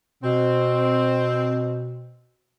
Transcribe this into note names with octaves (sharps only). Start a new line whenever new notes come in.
B2 C4